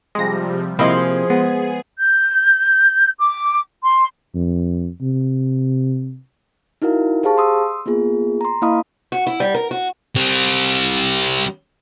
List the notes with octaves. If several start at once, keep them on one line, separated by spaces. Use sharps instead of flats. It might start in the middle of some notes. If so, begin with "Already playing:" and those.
C3 F3 G3 G#3 A#6
C3 F3 A#3 C4 E4 G#4 D#5 C6
G#3 B3
G6
D6
C6
F2
C3
D#4 E4 F#4 A#4 F5
G4 G#4 C5 F5 A5 C#6
C6 D#6 E6
A#3 B3 F4 G#4
A#5 C6
A#3 E4 D#5 F5 B5 D#6
F#4
E4
G3
A#4
F#4
G3 C4